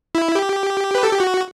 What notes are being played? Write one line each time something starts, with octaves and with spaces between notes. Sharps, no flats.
E4
G4
B4
A4
G4
F#4